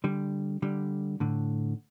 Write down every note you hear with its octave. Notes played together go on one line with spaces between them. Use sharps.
D3 G3
D3 G3
A2 D3